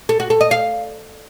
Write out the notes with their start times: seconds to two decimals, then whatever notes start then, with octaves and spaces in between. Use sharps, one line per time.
0.09 A4
0.20 F#4
0.30 A4
0.41 D#5
0.51 F5